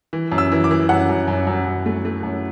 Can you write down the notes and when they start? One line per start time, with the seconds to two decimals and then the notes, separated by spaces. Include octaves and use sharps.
0.13 E3
0.32 F#2
0.38 E6
0.52 E3
0.64 D6
0.71 E3
0.89 F#2 F#5
1.09 F#2
1.28 F#2
1.47 F#2
1.66 F#2
1.86 A3
2.05 A3
2.23 F#2